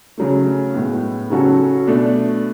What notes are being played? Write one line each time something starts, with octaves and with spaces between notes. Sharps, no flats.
C#3 F#3 A3
A2 G#3 B3
C#3 F#3 C#4 F#4 A4
B2 A3 D4